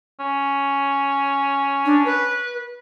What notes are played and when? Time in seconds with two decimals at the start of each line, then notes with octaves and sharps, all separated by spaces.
0.20 C#4
1.85 D4
2.05 B4